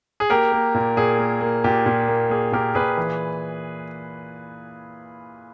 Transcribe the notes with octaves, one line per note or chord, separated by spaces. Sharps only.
G#4
A#3 G4 A#4
A#3
A#2
A#2 G#4
A#3
A#3
A#2 G4
A#2
A#3
A#3 G#4
A#2 G4 A#4
A#2 G#4 B4
E3